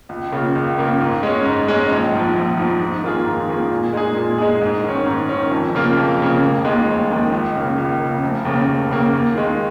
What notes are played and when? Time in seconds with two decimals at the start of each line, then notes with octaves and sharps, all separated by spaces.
0.09 C#2
0.32 C#3 A#3 F4
0.55 C#2
0.78 C#3 A#3 F4
1.00 G#2
1.23 G#3 C#4
1.46 G#2
1.68 G#3 C#4
1.91 A#1
2.13 G#2 F3
2.35 A#1
2.57 G#2 F3
2.81 G#2
3.04 D#3 A#3 F4 G#4
3.26 G#2
3.48 D#3 A#3 F4 G#4
3.71 A#2
3.93 G#3 D#4 G#4
4.16 A#2
4.38 G#3 D#4 G#4
4.61 G#2
4.84 D#3 C#4
5.06 G#2
5.29 D#3 C#4
5.51 F2
5.75 C#3 A#3 F4
5.97 F2
6.19 C#3 A#3 F4
6.43 F1
6.65 D#2 D#3 G#3
6.88 F1
7.10 D#2 D#3 G#3
7.32 C#2
7.55 C#3 A#3
7.78 C#2
8.00 C#3 A#3
8.23 F1
8.45 D#2 C#3 A#3
8.68 F1
8.90 D#2 C#3 A#3
9.13 D#2
9.35 D#3 G#3